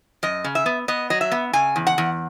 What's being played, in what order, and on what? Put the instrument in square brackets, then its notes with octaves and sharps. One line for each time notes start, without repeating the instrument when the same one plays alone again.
[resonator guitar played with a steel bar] F#2 D#5
C#3
E5
B3
B3 D#5
F#3 D#5
E5
B3
C#3 G#5
E2
F#5
E2